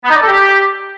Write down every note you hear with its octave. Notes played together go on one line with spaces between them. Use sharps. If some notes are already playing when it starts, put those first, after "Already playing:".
B3
D#4
D5
A4
G4